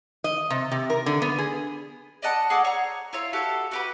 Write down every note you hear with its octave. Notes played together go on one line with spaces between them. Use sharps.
D#5
C3
C3
A#4
D3
B3
G#4
D5 D#5 F#5 A5
G#4 A4 D5 F#5
C#5 A#5
E4 F4 C#5
F#4 G4 A4 F5
F#4 G4 B4